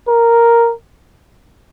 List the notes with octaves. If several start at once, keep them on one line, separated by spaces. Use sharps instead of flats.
A#4